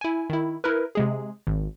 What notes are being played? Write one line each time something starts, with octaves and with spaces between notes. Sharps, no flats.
E4 G#5
D#3 E4
E4 A#4 B4
C3 G#3 G#4
G#1